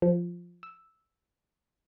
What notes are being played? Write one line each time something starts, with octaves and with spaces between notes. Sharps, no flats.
F3
E6